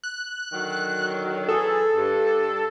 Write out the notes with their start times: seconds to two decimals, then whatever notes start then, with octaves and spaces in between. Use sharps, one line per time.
0.04 F#6
0.53 D3 D#3 F#3
1.49 E3 F#3 G#4 A4
1.95 G2